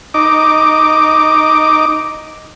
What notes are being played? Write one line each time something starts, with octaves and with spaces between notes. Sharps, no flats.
D#4 D6